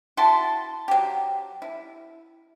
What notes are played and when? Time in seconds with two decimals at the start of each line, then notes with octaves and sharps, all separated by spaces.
0.17 E4 F#4 A5 C6
0.88 F#3 G4
1.62 E4